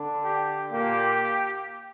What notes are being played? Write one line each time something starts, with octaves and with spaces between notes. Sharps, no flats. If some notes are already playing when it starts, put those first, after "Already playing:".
Already playing: D3 D4
G4
A#2 A#3 G4